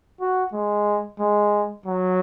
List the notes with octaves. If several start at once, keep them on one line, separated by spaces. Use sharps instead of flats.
F#4
G#3
G#3
F#3